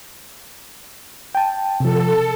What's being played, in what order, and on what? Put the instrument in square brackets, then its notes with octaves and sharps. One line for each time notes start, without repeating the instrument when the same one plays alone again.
[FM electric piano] G5 A5
[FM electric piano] C3 F3 [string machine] A4